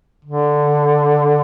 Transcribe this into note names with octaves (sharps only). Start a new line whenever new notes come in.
D3